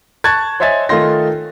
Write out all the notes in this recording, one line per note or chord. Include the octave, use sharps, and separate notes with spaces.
A5 C#6 F#6 G#6 A6
C5 C#5 D#5 E5 G#5 A6
D#3 A3 D#4 F4 C6 A#6